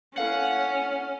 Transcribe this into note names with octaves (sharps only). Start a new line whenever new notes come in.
C#4 E4 A4 F5 F#5